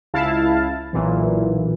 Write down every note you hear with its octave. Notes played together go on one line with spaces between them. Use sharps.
C#2 E4 F5 A5
B1 A#2 E3